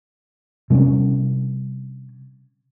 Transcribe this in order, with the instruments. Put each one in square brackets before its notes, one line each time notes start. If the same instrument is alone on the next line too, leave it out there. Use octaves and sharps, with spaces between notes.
[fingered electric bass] C3 G3 C4 C#4